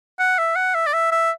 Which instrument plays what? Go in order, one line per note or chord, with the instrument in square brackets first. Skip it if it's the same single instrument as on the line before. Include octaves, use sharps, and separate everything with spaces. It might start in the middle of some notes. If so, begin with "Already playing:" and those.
[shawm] F#5
E5
F#5
E5
D5
E5
E5